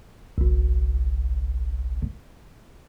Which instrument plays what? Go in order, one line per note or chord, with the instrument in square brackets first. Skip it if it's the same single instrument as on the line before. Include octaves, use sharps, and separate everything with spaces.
[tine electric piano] G1 C2